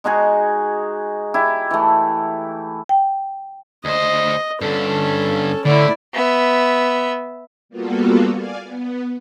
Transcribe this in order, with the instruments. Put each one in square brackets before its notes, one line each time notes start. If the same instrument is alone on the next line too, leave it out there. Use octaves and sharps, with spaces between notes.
[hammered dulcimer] G#3 D#4 F#4 G#4
E4 G4
E3 A3
[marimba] G5
[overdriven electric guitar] D2 C5 [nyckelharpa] D#5
[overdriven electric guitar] G2 D3 [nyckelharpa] C#4 A4
[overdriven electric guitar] A2 A3 [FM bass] D3 [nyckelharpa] E4 D5
[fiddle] B3 E5
[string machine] G3 A#3 B3 F4 F#4 A4
D5 F5 G#5
B3